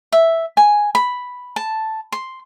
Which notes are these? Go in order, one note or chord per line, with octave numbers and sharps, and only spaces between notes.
E5
G#5
B5
A5
C6